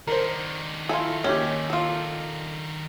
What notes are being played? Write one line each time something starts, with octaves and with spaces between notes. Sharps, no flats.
D#3 D4 A#4 C5
E4 F4 A4 G#5
D#2 C#4 G4
F4 A4